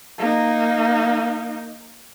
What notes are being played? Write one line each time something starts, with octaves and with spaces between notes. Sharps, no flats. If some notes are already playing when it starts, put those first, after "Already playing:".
A#3 D#4